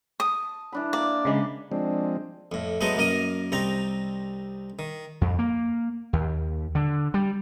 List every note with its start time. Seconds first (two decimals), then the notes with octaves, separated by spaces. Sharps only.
0.20 A5 D#6
0.73 E3 D4 B5
0.93 A#3 D5
1.25 C#3 G#3 C5 A5 B5
1.72 F3 G#3 C4 D4
2.52 F2 A2
2.81 F#3 G#3 A3 B3 D#4 D#5
2.97 F#2 A#3 A#4 D#5 D#6
3.52 C2 C4 D#4 A#5
4.79 D#3
5.21 F2
5.39 A#3
6.13 D#2
6.75 D3
7.14 G3